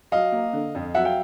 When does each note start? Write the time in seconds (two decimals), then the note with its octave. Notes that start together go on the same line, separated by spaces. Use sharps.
0.12 F#3 D#5 F5
0.32 A#3
0.53 D3
0.75 F2
0.94 F#3 E5 F#5
1.05 F5 G5